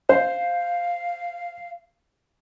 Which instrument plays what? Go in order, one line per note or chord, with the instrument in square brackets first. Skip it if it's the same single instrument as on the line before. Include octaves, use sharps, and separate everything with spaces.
[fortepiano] C5 [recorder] F5